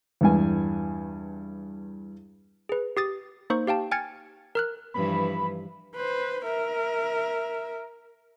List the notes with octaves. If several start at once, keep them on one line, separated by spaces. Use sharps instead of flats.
E2 G2 G#5
G#4 B4
G4 D#6 A6
A#3 D#4 C5 C#6
G4 F5 G5 A5
G5 G#5 F6 G#6 A6 C#7
A#4 F6 F#6
G2 E3 F3 B5
B4 C5
A#4 E5